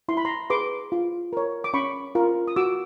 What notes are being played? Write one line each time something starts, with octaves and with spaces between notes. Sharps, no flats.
E4 C6
B5
A#5 C6
G#4 B4 C6 D6
F4
A#4 C#5
D6
C#4 B5 C#6
F4 A#4
D#6
F#4 D6 E6